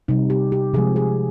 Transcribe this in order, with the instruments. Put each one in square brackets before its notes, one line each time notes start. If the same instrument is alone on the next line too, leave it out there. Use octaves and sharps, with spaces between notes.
[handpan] C3 G3 D#4
G4
G4
C3 F3 G#3 G#4
G#4